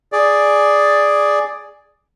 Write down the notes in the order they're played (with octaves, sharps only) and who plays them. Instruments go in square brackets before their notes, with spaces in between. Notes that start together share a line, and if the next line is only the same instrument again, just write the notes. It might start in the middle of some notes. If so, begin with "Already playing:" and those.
[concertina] G#4 D5